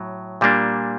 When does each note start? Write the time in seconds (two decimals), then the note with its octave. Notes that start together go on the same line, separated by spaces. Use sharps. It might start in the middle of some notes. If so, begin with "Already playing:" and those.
Already playing: A2 F#3
0.41 A#2 G3 A#3 D4